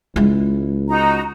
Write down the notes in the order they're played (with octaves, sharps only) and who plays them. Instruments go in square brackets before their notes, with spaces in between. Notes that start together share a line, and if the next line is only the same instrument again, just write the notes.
[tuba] C#2 [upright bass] G#3 E4
[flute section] D#4 F#4 A#5